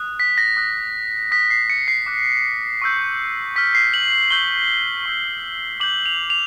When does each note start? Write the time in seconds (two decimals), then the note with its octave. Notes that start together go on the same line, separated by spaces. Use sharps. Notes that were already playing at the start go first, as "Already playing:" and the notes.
Already playing: D#6 F#6
0.20 B6
0.38 A#6
0.57 D#6 F#6
1.31 D#6 F#6 B6
1.50 C7
1.70 C#7
1.88 C7
2.06 D6 F#6
2.82 C#6 E6 G6
3.56 C#6 F6 B6
3.75 C7
3.94 F#7
4.12 F#7
4.30 C#6 E6 G6 G7
5.06 C#6 E6 G6
5.80 D6 G6 F#7
6.06 F7
6.30 F7